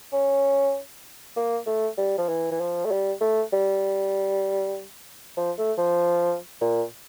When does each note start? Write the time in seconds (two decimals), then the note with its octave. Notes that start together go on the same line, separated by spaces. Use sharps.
0.13 C#4
1.37 A#3
1.67 A3
1.98 G3
2.18 F3
2.29 E3
2.52 E3
2.60 F3
2.85 A3
2.91 G3
3.21 A3
3.53 G3
5.37 F3
5.58 A3
5.78 F3
6.61 A#2